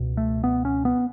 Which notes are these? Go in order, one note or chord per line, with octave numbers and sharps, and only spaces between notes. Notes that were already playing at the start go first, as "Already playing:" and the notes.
Already playing: C#2 B2
A3
B3
C#4
B3